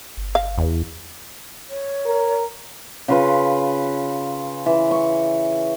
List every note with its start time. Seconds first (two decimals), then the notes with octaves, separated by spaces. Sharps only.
0.17 G1
0.35 F5
0.58 E2
1.70 C#5
2.06 A#4
3.08 C#3 F4 B4
4.66 E3
4.91 C#6